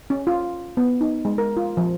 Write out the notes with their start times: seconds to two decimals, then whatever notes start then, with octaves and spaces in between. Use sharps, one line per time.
0.10 C#4
0.27 F4
0.77 B3
1.01 D#4
1.25 G#3
1.38 A#4
1.57 F4
1.77 F3